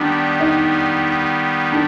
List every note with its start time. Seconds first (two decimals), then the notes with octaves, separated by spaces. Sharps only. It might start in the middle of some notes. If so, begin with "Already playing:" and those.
Already playing: D#3 G3 B3 D4
0.40 D#4
1.72 D4